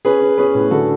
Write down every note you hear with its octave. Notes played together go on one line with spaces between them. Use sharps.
C#4 G#4 B4
C#4
C#4 G#4 B4
A2
D3 F#4 A4